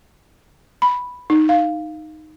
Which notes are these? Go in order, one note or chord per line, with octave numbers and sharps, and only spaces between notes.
B5
D#4
F5